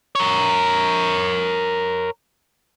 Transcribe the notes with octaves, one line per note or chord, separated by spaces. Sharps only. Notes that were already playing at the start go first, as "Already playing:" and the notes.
A#4 C#5